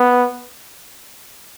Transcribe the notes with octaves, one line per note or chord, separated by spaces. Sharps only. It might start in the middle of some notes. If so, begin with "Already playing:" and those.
Already playing: B3